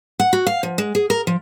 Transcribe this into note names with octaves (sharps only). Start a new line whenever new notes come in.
F#5
F#4
F5
F3
G#3
G#4
A#4
F3